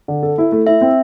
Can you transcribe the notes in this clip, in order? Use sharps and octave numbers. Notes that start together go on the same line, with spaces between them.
D3
A4
E4
A3
E4 E5
C4